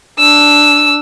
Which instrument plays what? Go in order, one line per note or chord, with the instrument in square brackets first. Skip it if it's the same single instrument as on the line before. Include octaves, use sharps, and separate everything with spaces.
[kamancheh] D4 [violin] E6